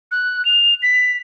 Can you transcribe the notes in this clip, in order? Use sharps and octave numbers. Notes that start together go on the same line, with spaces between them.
F#6
F7
B6